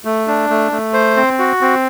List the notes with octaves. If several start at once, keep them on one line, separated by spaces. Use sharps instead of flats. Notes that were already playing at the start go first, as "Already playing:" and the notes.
A3
D4
A3
A3
C5
C4
F#4
C4